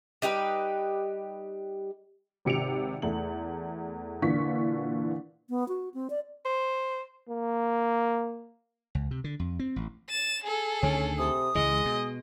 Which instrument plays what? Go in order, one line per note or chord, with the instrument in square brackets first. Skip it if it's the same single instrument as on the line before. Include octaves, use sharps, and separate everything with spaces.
[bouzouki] G3 D#4 G4 B4
[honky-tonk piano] G#1 C3 C#7 D7 F7
E2 A3 F#7
A#2 D3 E3 F4 C#6 B6
[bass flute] B3
F#4
C4
D5
[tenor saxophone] C5
[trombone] A#3
[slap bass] C#2
C3
D3
F2
C4
A1
[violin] A6 E7
G#4 A4
[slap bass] D2 D3 D#3 [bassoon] C#4
[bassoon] C3 [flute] D#6
[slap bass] C#2 E3 [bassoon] G#3 [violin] D#5
[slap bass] B2